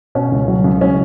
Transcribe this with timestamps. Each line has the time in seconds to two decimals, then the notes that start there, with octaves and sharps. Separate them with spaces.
0.15 B2 C#4
0.32 C#2
0.48 F#3
0.64 C#2
0.81 F#3 C#4